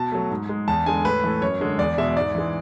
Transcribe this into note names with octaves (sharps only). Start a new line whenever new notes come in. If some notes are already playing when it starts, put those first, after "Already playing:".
Already playing: B2 A5
F#3 A3
G#2
G#3
E2 A5
D3 G#3 G#5
A2 B4
E3 A3
F#2 C#5
D3 G#3
E2 D5
B2 G#3 E5
G#2 D5
E3 G#3